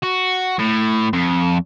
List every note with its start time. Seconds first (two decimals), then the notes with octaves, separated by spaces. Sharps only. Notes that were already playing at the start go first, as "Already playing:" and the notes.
0.03 F#4
0.59 A2
1.13 F2